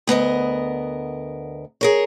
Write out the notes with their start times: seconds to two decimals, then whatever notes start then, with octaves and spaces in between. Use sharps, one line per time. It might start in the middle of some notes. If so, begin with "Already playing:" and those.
0.07 D2 B3 A#4 D#5
1.81 G#4 A#4 C#5